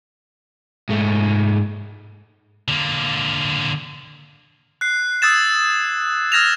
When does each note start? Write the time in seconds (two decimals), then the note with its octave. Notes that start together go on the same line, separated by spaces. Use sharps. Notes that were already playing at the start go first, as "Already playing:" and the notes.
0.89 G#2 A3
2.68 D3 A#3
4.81 F#6 C7
5.22 D#6 E6 G#6 A6 E7
6.32 D#6 F6 G#6 A#6 E7 F7